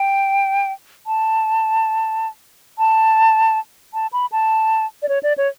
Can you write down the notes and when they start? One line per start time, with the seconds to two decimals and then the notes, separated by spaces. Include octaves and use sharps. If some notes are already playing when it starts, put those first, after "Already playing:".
Already playing: G5
1.07 A5
2.79 A5
3.94 A5
4.13 B5
4.32 A5
5.02 D5
5.09 C#5
5.23 D5
5.38 C#5